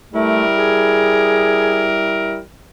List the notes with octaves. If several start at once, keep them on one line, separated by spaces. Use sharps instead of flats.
G3 A3 E4 A#4
G#4